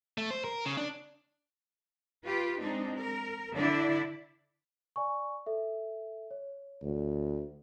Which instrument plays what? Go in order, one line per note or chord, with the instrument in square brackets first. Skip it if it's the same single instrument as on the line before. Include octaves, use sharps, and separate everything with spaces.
[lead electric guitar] A3
C5
A#4
C#3
D4
[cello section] F4 G4 B4
G#3 C4 D4 D#4
A#4
D3 D4 E4 D5
[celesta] D5 G#5 C#6
A4 E5
C#5
[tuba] D2